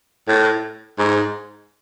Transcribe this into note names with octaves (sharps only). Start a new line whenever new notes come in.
A2
G#2